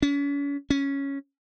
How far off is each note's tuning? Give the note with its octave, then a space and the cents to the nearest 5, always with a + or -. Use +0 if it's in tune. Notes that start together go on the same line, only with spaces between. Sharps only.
C#4 +40
C#4 +0